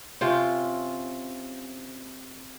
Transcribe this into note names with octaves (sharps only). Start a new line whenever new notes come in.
C3 C#4 F4 G5